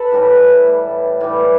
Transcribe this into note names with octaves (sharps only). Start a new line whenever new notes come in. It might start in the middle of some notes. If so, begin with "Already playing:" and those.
Already playing: A4 B4
A2 E3 G3
A2 E3 G3
A2 E3 G3 D5